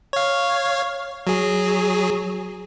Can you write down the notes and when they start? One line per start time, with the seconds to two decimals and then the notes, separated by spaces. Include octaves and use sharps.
0.13 C#5 F5
1.27 F#3 G#4